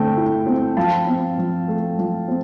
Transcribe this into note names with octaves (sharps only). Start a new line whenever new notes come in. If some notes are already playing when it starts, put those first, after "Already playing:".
Already playing: D3 A3 C4 G5
E4
C4
F3 F5 A5
C4
F3
A3
F3
C4